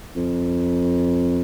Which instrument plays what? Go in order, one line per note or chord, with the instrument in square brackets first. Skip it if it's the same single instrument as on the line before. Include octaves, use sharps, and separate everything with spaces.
[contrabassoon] F2